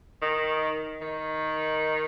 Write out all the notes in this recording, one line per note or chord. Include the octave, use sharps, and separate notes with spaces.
D#3
D#3